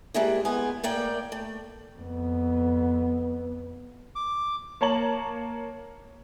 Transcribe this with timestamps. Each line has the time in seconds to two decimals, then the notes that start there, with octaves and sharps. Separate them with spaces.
0.14 G3 G#3 A#3 E4
0.45 G#3 B3 G#5
0.84 A2 A#3 D5 G5
1.32 A3
1.98 F2 B3
4.16 D6
4.81 A#3 C#5 A5 A#5 F#7